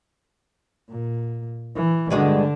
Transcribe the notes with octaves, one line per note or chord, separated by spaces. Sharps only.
A#2
E3
G2 D3 G#3 D4 F#4